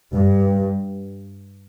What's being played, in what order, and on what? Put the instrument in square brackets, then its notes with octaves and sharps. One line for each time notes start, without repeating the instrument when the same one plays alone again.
[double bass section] G2